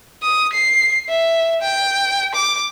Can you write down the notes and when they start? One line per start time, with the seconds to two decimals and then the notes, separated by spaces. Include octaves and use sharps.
0.23 D#6
0.53 C7
1.09 E5
1.62 G5
2.35 D6